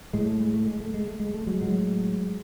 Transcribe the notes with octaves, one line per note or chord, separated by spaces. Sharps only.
A2 G#3
A3
G#3
A3
G#3
A3
G#3
A3
G#3
A3
F#3 G#3
A2 F#3 G#3